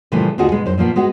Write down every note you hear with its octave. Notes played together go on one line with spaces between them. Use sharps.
A#2 C#3 E3 F3 G3 A3
D2 F4 F#4 G#4 D#5 F#5
B2 G#3
F#2 C5
A#2 F3 A#3 B3
G#3 B3 F#4